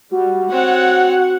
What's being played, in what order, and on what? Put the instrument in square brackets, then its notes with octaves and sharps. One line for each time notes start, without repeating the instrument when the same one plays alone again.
[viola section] G3 [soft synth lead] F#4
[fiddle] C4 C#5 [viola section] F#5